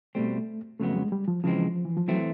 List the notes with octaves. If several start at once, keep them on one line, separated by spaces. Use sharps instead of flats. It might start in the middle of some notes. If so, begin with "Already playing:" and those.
B2 G3 A3 C4
F2 C#3 F#3 A3 B3
G#3
G3
F3
C#3 E3 F3 G#3 C4
E3
F3
E3 F#3 A3 C4